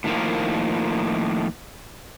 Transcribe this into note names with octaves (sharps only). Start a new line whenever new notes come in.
A2 D#3 F3 A#3